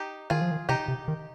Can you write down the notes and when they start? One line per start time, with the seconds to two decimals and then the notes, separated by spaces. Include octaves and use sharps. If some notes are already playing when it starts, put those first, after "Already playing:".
Already playing: D#4 G4
0.30 D#3 F4 G#4
0.41 F3
0.51 D#3
0.69 C3 D#4 G4
0.88 C3
1.08 D#3